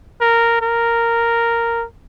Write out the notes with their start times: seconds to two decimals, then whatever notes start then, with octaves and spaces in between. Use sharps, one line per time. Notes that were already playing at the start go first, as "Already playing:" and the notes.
0.21 A#4
0.62 A#4